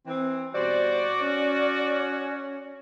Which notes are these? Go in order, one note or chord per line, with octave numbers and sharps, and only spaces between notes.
E3 C4
B2 G3 F#4 C5 D5
C#4